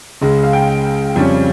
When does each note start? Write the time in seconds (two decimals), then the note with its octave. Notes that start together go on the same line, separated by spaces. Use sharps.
0.21 C#2 C#3 G#3
0.43 F5
0.53 G5
1.16 F2 C#3 G3 C#4